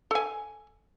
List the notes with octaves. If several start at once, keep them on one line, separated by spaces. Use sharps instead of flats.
A4 G#5